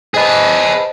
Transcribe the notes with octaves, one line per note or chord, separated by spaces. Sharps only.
G#4 B4 C5 D#5 A5